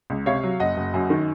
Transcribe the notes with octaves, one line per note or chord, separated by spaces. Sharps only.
C#2
C3 C#5 F5
F#3
F#1 D#5 F#5
F#1
F#2
D#3